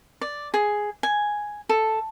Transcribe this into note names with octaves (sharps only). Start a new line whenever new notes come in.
D5
G#4
G#5
A4